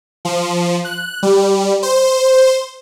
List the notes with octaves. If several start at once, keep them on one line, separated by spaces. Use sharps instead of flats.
F3
F#6
G3
C5